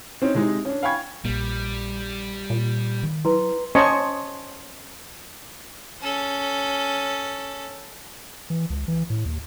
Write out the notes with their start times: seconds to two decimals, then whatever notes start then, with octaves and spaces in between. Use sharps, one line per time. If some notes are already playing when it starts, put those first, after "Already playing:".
0.22 C4 C#4 D#4
0.35 C3 G#3 D#4
0.65 C#4 D4
0.83 F5 G5 G#5 B5 C#6 G#6
1.25 A#1 A#2 G3
2.50 A#2
3.03 D#3
3.25 F#3 E4 B4 A#5 C6
3.75 C#4 C5 D#5 G#5 A5 C#6
6.01 C#4 A4
8.50 E3
8.70 C#2
8.88 E3
9.10 A2
9.26 D#2